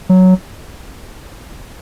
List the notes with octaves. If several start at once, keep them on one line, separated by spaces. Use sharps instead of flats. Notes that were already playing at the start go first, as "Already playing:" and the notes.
F#3